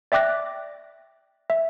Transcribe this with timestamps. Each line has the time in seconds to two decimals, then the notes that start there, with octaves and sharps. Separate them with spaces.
0.12 D5 E5 G5 D6 F#6 A#6
1.50 E5